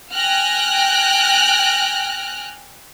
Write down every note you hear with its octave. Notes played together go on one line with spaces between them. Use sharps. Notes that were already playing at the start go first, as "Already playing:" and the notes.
G5 G#5 F6 F#6 A#6